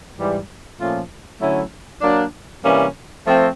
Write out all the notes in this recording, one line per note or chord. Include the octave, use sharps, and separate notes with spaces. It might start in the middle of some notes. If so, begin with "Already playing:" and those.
G#2 E3 G3
A#2 F3 A3 C#4 F4
D3 F#3 A3 C#4 E4
F#3 A#3 D4
C3 E3 G3 A#3 C#4
F3 A3 C4